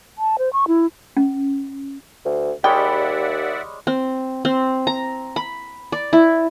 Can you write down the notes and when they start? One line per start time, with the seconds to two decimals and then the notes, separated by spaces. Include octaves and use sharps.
0.18 A5
0.39 C5
0.53 C#6
0.68 E4
1.17 C#4
2.25 D2
2.64 D#2 G3 G#3 C#5 D5 E5 F#5 G5
3.87 C4
4.45 C4
4.87 A#5
5.36 B5
5.92 D5
6.13 E4